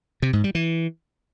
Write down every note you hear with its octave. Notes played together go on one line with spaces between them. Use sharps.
C3
G#2
G3
E3